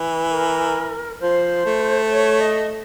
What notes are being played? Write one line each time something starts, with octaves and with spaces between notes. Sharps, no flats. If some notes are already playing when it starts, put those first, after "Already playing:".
Already playing: E3
A#4
F3 C5
A3
C#5
D#5